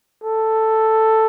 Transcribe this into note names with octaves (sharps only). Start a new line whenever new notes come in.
A4